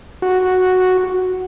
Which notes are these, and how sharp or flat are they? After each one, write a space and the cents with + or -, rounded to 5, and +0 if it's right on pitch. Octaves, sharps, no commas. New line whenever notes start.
F#4 +0